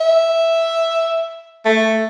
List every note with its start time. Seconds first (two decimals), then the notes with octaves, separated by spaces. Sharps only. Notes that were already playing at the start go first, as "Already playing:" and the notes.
0.01 E5
1.65 A3